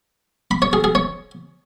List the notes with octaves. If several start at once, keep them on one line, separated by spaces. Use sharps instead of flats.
B5
C#5
G#4
G#4
C#5